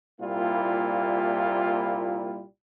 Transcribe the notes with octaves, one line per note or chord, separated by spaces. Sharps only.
C2 A#2 G3 A#3 E4 F4